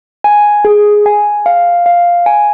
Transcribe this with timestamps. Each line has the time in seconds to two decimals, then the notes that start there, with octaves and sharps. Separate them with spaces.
0.24 G#5
0.65 G#4
1.06 G#5
1.46 F5
1.86 F5
2.26 G#5